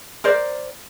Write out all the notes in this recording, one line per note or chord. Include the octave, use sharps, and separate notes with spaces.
A#4 C5 D5